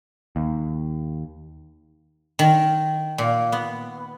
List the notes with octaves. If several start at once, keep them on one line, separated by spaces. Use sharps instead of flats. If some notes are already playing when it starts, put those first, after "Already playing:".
D#2
D#3
A#2
B3